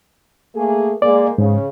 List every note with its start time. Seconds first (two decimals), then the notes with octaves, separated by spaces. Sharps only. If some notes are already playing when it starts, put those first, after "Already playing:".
0.56 A3 A#3 G#4
1.02 G#3 A#3 G#4 D5
1.38 G#2 C#3